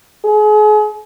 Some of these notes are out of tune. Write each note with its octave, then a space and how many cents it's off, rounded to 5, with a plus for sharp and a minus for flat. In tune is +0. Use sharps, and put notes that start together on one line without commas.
G#4 +35